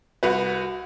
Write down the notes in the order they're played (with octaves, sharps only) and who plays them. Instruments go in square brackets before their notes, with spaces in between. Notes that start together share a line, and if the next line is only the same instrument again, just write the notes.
[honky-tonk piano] C2 F#4 B4